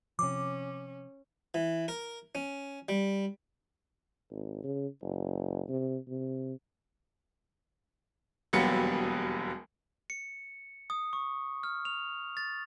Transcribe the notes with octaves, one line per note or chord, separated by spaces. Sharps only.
C3 F3 C#4 D6
E3
A#4
C#4
G3
G#1
C#3
F#1
C3
C3
E1 D#2 F#3 G3 B3 C#7
C#7
D#6
C#6
F6
F7
A6